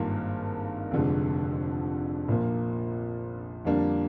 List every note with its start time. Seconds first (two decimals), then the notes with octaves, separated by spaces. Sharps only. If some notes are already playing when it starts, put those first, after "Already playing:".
Already playing: G#1 G2 D#3 A#3 F4
0.91 F1 F2 D3 G#3
2.28 A#1 A#2 F3 A#3
3.65 F2 D3 G3 A#3 D4